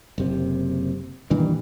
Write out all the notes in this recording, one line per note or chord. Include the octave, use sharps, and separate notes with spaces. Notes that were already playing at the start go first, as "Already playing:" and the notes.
F#1 C3
G2 A#2 D#3 E3